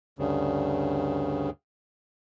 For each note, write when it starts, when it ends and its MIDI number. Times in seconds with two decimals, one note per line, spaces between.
0.19 1.50 38
0.19 1.50 43
0.19 1.50 49